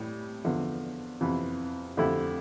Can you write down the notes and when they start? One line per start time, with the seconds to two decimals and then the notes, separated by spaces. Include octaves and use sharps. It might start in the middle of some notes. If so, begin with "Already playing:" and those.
Already playing: A2 E3 G3
0.45 E2 D3 F3
1.21 F2 C3 E3 B3
1.97 F2 D3 A3 E4 G4